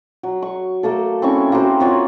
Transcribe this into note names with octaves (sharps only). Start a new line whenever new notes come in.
F#3
C#6
A3 A#3 A4
C4 C#4 E4 C#6
A#3 F#4 G4 C5
C4 F4 C#5 F#5